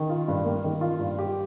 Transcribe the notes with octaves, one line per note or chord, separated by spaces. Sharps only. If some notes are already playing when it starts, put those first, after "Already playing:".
Already playing: D#3
F4
G2
A#3
D#3
F4
G2
G4